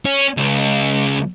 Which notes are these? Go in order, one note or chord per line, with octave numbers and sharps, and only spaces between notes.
C#4
C#2